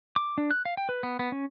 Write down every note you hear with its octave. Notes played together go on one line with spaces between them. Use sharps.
D6
D4
F#6
F5
G5
B4
B3
B3
C#4